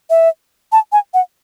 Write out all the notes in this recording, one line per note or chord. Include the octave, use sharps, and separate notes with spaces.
E5
A5
G#5
F#5